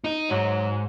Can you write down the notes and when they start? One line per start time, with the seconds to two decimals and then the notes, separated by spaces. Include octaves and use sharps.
0.04 D#4 D#5
0.30 G#2 F#3